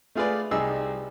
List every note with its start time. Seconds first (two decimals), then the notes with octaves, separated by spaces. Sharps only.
0.15 A3 F4 G#4 B4 D5
0.51 C2 D#4 G#4 E6